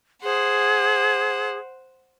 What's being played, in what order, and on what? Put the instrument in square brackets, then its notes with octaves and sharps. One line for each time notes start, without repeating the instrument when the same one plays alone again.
[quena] G#4 [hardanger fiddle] C5 F#5